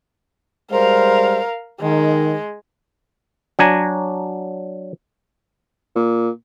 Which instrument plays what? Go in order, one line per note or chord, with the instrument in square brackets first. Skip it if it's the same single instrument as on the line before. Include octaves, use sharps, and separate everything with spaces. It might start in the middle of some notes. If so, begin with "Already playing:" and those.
[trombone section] G3 G#3 C5 [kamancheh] A#4 F5
[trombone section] D#3 [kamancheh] G#3
[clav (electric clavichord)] F#3 D4 G#5 A#5
[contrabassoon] A#2